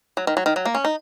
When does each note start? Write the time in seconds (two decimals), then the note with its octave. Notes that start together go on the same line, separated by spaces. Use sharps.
0.17 F#3
0.27 D#3
0.37 F#3
0.46 D#3
0.56 F#3
0.65 A#3
0.75 C#4
0.85 D#4